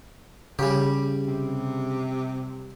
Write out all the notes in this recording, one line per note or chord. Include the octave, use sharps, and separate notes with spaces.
C#3 G3 G4
C3